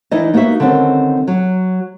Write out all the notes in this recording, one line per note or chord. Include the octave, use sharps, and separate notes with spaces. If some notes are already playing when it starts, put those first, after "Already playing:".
E3 D#4 E4 B4 D5 D#5
A#3 B3 D#4 F#4 E5
D3 D#3 G3 C4 C#4
F#3